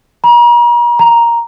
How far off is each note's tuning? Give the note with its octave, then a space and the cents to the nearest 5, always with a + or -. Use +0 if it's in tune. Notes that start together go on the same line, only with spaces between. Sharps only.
A#5 +40
A#5 +5